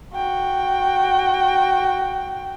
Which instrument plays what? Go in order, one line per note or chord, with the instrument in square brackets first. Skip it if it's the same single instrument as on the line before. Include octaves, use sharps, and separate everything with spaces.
[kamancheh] F#4 G5